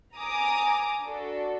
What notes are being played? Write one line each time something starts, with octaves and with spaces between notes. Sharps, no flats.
G#5 A#5 D6 D#6
D4 F#4 A4